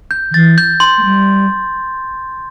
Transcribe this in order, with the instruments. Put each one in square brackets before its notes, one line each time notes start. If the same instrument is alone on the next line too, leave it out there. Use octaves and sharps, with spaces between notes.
[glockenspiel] G6
[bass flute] D3
[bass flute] E3 [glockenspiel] A6
[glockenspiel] G6
C6
[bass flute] A3
G3